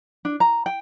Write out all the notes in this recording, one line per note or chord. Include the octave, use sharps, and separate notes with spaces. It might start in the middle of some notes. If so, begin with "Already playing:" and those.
D4
A#5
G5